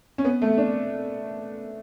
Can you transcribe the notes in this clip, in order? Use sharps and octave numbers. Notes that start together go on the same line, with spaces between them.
C#4
B3
A3
D4